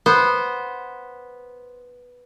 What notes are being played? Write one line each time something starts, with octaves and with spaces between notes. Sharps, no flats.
B3 C5